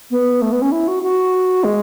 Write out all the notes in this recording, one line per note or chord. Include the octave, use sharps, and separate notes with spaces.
B3
A3
B3
C#4
E4
F#4
F#4
G#3